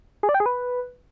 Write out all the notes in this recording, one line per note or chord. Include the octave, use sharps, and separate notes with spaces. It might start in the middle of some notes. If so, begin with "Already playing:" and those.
G#4
D5
G5
G#4
B4